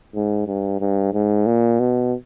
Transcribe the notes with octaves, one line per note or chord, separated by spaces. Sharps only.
G#2
G2
G2
G#2
A#2
B2